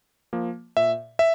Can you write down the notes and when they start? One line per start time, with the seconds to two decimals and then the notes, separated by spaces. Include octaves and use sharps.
0.33 F3 A#3
0.77 A#2 E5
1.19 E5